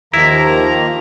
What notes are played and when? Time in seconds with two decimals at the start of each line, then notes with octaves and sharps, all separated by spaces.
0.14 D#2 D#3 F3 A#3 E4 A#5